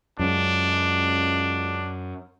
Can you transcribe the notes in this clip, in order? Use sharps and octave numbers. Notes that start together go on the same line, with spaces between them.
C#2 F#2 D4